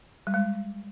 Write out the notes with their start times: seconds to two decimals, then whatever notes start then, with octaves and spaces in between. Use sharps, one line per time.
0.27 G3
0.34 G#3